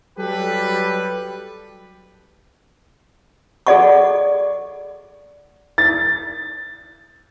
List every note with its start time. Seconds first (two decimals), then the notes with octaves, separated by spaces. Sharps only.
0.19 F#3 G3 G4 A4 B4
3.67 G#4 A4 D5 D#5 F#5 C#6
5.78 A6